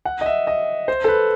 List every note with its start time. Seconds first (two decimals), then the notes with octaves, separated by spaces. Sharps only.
0.05 F#5
0.21 D#5
0.26 E5
0.47 D#5
0.88 C5
1.04 A4
1.08 B4